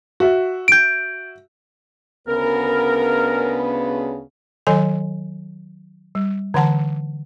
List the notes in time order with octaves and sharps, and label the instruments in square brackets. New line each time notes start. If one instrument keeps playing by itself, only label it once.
[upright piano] F#4 E5
[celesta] G6 D7
[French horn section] D2 C#3 B3 [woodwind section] A#4
[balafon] D#3 F#3 A4 D#5 G#5
G3
D3 E3 F#5 A5